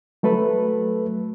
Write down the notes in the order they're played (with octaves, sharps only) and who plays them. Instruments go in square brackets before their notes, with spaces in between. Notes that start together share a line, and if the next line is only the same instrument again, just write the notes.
[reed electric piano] F#3 A3 A4 B4